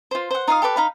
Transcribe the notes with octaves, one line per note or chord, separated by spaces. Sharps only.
F4 C5
C5 F#5
D#4 F4 F5 D#6
G4 A4 B4 D6
D#4 F5 B5